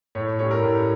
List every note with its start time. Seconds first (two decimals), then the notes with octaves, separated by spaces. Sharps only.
0.15 A2 C#5
0.39 G3 C#4 E4 C#5
0.51 A#4
0.63 A2